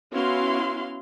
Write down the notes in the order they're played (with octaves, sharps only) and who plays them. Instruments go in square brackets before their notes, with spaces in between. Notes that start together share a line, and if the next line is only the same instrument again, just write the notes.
[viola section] B3 C#4 E4 F#4 F5 C6